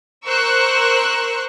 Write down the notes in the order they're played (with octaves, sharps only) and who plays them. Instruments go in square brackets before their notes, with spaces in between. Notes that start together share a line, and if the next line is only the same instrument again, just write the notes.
[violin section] A#4 C5 C#6 E6 F#6